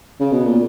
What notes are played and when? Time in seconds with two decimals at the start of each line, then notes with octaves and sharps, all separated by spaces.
0.20 C#3
0.32 B2
0.45 A#2